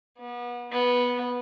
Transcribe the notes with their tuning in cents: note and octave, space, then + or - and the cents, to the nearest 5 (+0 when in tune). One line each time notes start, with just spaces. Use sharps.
B3 -30
B3 -10